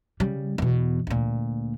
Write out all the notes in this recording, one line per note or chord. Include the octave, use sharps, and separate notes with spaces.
C#3 G3
E2 B2
D2 A#2